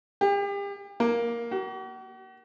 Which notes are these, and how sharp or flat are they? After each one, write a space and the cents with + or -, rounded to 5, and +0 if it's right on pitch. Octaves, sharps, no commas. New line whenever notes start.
G4 +40
A#3 +10
F#4 +45